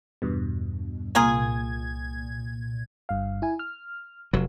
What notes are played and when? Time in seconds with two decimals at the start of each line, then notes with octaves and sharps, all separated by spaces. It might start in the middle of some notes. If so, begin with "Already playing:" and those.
0.22 E2 G2 B2
1.15 C2 A#2 A#3 F4 G#4 G#6
3.09 G1 G2 F5
3.42 E4 G#5
3.59 F6
4.33 F1 F#3